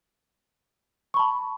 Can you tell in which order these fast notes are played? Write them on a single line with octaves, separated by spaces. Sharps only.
C#6 B5 A5